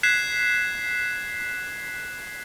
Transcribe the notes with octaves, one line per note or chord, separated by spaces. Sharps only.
F#6 G#6 B6 C7 E7